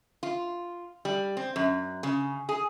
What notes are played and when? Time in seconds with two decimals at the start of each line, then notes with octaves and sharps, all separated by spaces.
0.23 F4
1.05 G3
1.37 C4
1.56 F#2
2.03 C#3
2.49 G#4